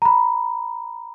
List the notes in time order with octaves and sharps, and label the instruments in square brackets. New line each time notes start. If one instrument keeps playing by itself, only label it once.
[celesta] A#5 B5